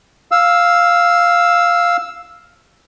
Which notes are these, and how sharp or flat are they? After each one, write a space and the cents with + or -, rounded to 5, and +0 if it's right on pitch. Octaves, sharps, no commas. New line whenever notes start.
F5 +0 E6 +0